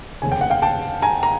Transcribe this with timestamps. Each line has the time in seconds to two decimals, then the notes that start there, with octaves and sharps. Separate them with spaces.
0.22 F1 D#2 C#3 G#5
0.32 G5
0.41 F#5
0.50 F5 G5
0.62 G5 A5
1.02 G#5 A#5
1.23 A#5